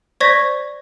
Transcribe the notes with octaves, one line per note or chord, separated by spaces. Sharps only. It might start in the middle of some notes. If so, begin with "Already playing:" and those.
C5 D5 C#6 G#6 A#6 B6